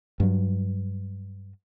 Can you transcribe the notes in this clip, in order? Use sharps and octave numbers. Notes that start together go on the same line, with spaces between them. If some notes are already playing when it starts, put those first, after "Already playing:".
G2 F#3